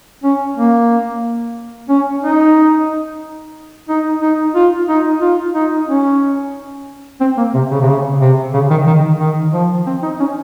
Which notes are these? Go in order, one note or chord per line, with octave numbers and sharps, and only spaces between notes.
C#4
A#3
C#4
D#4
D#4
D#4
F4
D#4
F4
D#4
C#4
C4
A#3
C3
C#3
C3
C#3
C3
C#3
D#3
D#3
D#3
F3
C4
D#4
C#4